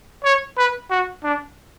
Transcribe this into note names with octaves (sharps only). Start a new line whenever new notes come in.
C#5
B4
F#4
D4